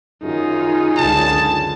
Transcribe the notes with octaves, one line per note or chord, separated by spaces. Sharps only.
F#2 D#3 D#4 F4 G#4
C#2 D3 A5